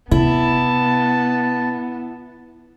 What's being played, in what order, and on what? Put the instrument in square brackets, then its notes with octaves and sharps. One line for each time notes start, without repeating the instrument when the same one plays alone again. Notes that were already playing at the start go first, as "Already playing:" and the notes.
[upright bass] C3 [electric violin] B3 [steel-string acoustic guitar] E4 [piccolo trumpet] A5